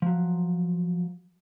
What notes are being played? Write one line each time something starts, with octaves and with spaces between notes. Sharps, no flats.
F3 F#3